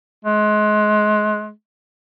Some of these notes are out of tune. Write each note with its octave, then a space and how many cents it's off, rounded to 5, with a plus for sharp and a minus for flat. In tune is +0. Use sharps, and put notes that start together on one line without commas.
G#3 +30